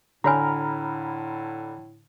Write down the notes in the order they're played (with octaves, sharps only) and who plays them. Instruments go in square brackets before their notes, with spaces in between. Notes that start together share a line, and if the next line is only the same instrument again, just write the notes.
[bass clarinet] A2 [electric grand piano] D3 [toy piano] F#4 C#5 G#5 [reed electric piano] A#5 B5 F6